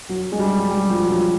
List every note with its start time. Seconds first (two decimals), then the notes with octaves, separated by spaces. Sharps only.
0.09 F#3
0.32 G#3
0.39 G3
0.59 F#3
0.71 G3
0.90 F3
1.06 F#3
1.11 F3